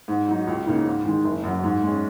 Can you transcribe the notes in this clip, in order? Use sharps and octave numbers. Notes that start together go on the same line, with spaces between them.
G#2
F#3 D#4
C#2
C#3 A#3 D#4
G#2
D#3 G#3
F#1
F#2 F#3
G#2
G#3 C#4